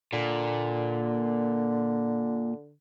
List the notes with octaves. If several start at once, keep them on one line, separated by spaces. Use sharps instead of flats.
A#2 D3